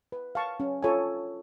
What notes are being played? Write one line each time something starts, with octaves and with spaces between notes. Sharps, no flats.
B4
F5 A5 C#6
C#4
F4 A4 C#5 G#5